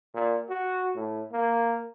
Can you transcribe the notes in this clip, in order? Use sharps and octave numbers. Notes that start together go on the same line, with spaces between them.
A#2
F#4
A2
A#3